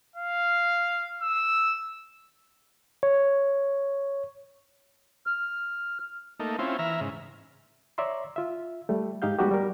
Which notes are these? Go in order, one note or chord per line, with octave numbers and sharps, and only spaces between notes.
F5
E6
C#5
F6
A3 A#3 D#4
C4 C#4 E4 F4
E3 E5 A#5 F6
G#2 C#3
C#5 D5 E5 A#5 C6
F4 E5
G3 A3
G#2 D#4 G4 F5 G6
G3 G#3 B3 D#4 F#4 G4
G3 A#4